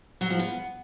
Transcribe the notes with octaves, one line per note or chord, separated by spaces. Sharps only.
F#3
F3
B3